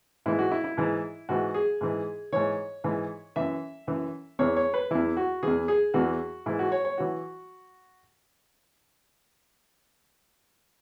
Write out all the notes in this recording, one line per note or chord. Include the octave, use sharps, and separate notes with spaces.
G#2 E3 E4
F#4
E4
E4
G#2 E3
G#2 E3 F#4
G#4
G#2 E3
G#2 E3 C#5
G#2 E3
F#2 E3 E5
F#2 E3
E2 E3 C#5
C#5
B4
E2 E3 E4
F#4
E2 E3 G#4
G#4
E2 E3 F#4
G#2 E3 E4
F#4
C#5
C#5
E3 F#4